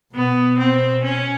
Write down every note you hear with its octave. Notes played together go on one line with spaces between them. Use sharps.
B2 B3
C4
C#4